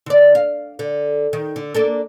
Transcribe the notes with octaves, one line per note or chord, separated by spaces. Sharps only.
D3 D5
F5
D3
D#3
D3
A#3 D4 A4